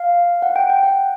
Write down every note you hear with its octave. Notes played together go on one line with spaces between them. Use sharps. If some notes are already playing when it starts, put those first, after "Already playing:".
Already playing: F5
F#5
G5
G5
F#5